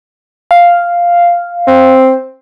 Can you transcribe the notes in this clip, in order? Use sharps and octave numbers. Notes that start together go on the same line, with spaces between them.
F5
C4